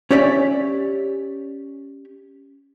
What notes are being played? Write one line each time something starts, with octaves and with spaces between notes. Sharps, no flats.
C#4 G4 C#5 D5 E5